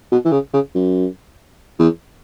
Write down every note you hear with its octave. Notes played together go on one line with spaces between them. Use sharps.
B2
E3
C#3
C#3
F#2
E2